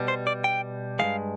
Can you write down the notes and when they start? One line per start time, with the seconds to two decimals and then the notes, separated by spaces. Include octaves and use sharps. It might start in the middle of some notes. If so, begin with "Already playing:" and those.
Already playing: B2 G3
0.08 C5
0.27 D5
0.44 G5
0.99 G2 D#3 G#3 F5